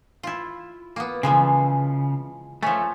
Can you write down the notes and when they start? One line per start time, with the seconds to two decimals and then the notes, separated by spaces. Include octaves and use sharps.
0.23 E4 F4
0.96 A#3 B3
1.23 C#3 E3 F3 G#3
2.63 F3 A3 C#4